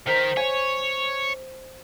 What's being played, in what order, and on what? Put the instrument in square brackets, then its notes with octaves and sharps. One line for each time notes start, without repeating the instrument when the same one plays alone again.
[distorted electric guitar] D#3 A#4 [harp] C5 B6
[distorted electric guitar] C#5 [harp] G#5